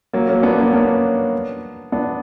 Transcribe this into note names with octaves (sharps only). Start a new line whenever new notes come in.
F#3 A#3
A#3 C#4
B3 D4
A#3 C#4
B3 D4
B3 D4